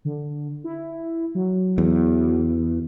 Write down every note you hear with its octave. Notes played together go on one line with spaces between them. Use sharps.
D3
E4
F#3
E2